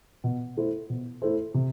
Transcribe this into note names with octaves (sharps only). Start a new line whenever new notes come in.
B2
A3 E4 A4 C5
B2
A3 E4 A4 C5
C3